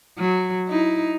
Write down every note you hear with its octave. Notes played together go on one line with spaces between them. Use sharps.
F#3
D#4 E4